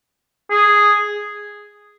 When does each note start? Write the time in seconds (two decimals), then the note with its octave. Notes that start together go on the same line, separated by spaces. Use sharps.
0.51 G#4